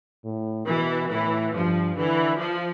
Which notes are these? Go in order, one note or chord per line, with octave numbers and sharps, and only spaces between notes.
A2
B2 E3
A2 E3
G2 F3
D3 E3
F3